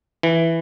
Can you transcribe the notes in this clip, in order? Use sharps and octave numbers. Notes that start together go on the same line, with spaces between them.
E3